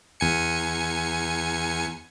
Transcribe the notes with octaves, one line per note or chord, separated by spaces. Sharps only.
E2 G#5 C#7